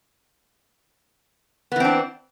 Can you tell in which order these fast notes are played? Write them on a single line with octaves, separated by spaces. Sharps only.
B3 E3 C4 D4